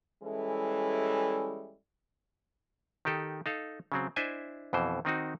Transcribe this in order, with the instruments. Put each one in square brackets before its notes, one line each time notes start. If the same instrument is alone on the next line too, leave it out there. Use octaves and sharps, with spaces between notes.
[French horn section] E3 G3 G#3 C#4 E4 A4
[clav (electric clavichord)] D#3 D#4 G4 A4
D#4 A4 F5
C#3 F#3 C4
D4 E4 C5 D#5 E5 G#5
F2 B2 E3 C5
D#3 C4 D#4 F#4